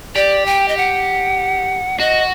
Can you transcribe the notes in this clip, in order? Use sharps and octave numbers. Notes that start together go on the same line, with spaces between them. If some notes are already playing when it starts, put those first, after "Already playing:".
G4 D5
G5
D#5
F#5
F#4 D#5